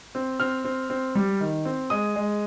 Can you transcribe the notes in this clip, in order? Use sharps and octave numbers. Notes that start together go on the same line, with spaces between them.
C4
C4 F6
C4
C4
G3
D#3
C4
G#3 D#6
G#3